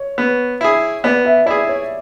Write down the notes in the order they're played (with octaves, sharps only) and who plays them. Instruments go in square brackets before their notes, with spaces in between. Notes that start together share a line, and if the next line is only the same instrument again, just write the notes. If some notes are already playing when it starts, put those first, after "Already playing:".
Already playing: [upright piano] C#5
[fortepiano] B3
E4 G#4
[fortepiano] B3 [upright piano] D5
[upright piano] E5
[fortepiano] E4 G#4 [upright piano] D5
[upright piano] C#5